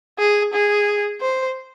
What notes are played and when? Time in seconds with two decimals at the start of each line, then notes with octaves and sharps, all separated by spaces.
0.19 G#4
0.53 G#4
1.21 C5